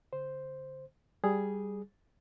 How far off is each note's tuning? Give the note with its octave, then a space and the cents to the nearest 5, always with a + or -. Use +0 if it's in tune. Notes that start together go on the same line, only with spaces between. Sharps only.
D3 -35 C5 +0
G3 +0 G#4 +0